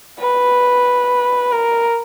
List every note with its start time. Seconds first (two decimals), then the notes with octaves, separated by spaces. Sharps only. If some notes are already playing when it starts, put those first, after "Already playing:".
0.19 B4
1.52 A#4